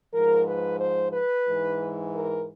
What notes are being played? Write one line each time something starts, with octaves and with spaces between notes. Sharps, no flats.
G#2 F3 A#4
B4
C5
B4
G#2 E3
A#4